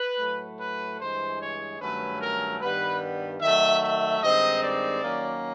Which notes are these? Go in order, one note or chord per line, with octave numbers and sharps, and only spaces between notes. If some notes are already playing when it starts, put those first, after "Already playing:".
Already playing: B4
A2 F#3 A3
B4
G2 E3 G#3 C5
C#5
G2 D#3 F#3 A3 C#4 B4
A#4
G2 D#3 G3 B3 B4
D#3 F#3 A3 E5
E5
G2 D#3 G#3 C4 D#4 D#5
D5
D#3 F#3 A#3 C#4